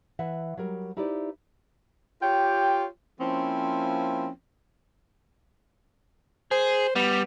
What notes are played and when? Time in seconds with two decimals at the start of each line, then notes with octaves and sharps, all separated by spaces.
0.19 E3 E5 F#5
0.57 F#3 G3 A#4
0.97 D#4 E4 G4 B4 C5 D5
2.22 F4 G4 C#5 G5
3.20 F3 A#3 C4 C#4 E4
6.51 G#4 C5
6.96 G3 B3